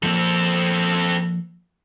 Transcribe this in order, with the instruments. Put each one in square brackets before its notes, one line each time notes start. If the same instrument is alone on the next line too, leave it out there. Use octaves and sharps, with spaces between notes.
[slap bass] F3 A#3 [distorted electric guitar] C4 A4